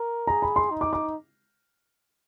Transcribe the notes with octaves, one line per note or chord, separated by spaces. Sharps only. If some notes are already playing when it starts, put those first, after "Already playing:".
Already playing: A#4
G#4 A#5
B5
C6
D#4
D6
D6